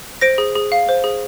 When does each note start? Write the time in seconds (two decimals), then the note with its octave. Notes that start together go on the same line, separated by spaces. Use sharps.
0.21 C5 A#6 D7
0.38 G#4
0.55 G#4
0.72 F5
0.89 C5
1.04 G#4